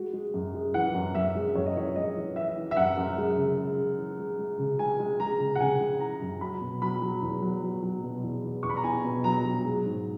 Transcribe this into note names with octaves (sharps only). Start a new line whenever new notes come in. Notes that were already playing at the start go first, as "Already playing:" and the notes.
Already playing: G#3 F#4
G#3
F#2
G#3
E3 F#5
F#2
F#2 E5
G#3
F#2 C#5
D#5
E3 C#5
G#3 D#5
E3
E3 E5
E3
E5
F#2 F#5
F#2
G#3
C#3
C#3
C#3
E3
G#3
G#3
C#3
G#3 G#5
G#3
G#3 A#5
C#3
F#5
C#3 G#5
G#3
E3 A#5
F#2
F#3 B5
B2
F#3 B5
F#3
E2
F#3
F#3
F#3
B2
E2
E2
E2 C#6
B5
A#5
E2 G#5
B2
F#3 A#5
F#3
G#3
G#2